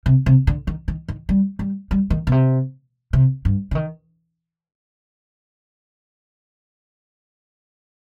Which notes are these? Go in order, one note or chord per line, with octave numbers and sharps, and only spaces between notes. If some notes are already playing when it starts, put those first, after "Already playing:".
C3
C3
D3
D#3
D#3
D#3
G3
G3
G3
D#3
B2
C3
C3
G2
D3
D#3